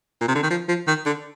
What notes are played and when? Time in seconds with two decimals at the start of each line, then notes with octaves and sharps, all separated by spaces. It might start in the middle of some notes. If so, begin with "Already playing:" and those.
0.21 A#2
0.28 C3
0.35 D3
0.43 D#3
0.50 F3
0.68 F3
0.88 D#3
1.06 D3